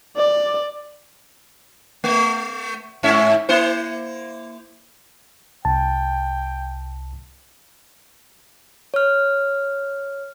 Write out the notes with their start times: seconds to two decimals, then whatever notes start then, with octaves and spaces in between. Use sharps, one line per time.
0.17 D5
2.04 A3
3.03 G#2 C#4 E5
3.49 A#3 E4 C5
5.65 C2 G5 A5
8.94 C#5 F6